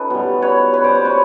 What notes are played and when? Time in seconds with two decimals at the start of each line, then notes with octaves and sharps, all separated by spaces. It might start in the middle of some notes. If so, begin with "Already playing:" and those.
Already playing: C#4 D#4 F4 A4 B4
0.10 B2 G3
0.42 B4 C#5
0.73 B4 C#5
0.84 C5 D5
0.95 B4 C#5
1.05 B4 C#5